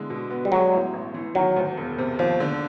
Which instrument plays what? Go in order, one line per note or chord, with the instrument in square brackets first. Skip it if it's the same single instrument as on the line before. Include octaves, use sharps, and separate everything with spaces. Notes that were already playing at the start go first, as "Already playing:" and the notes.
Already playing: [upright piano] D3 G#3 E4
B2
B3
[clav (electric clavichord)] G3
[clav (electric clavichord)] F#3 [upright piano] G#3
[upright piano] A2
A1
E3
[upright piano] D#3 [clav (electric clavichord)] F#3
[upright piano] D2
E1
C3
[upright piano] D#2 [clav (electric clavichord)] F3
[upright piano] D3